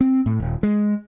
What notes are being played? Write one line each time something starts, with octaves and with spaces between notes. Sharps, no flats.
C4
A2
D#1
G#3